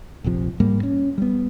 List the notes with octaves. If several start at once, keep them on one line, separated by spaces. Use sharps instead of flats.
F1 A#1 C3 F3
G#2 G3 A#3
C#4
G3 B3